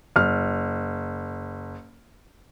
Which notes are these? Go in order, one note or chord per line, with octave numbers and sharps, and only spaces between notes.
F#1 F6